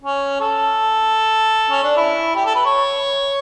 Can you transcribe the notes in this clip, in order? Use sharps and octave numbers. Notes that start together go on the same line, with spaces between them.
C#4
A4
C#4
D4
E4
G4
A4
B4
C#5